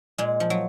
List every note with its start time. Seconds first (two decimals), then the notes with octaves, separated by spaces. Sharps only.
0.18 A#2 G#3
0.40 F3
0.50 F#3